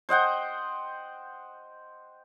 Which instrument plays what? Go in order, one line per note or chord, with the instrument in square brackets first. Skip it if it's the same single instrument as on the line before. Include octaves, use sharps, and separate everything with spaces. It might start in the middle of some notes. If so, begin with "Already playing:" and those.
[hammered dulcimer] C5 D#5 F#5 G5